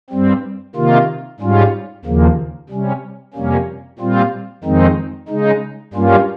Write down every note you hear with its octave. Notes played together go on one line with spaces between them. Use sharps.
G2 G3 C4
C3 D#3 A#3 F4
G#2 G3 C#4 F4
D#2 C#3 F3 A#3
C3 G3 C#4
F2 C3 G3 A#3 C#4
A#2 G3 C4 F4
F2 D#3 G#3 C4 D#4
C#3 G#3 D#4
G2 G3 A#3 C#4 F4